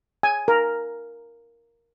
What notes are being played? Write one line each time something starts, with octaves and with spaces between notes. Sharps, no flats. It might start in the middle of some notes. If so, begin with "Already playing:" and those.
G#5
A#4